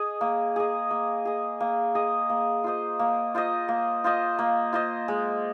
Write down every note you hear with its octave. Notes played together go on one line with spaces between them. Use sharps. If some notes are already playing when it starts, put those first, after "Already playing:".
Already playing: G#4 D#5
A#3
G#4 D#5
A#3
G#4 D#5
A#3
G#4 D#5
A#3
F4 C5 D#5
A#3
F4 C5 D#5
A#3
F4 C5 D#5
A#3
F4 C5 D#5
G#3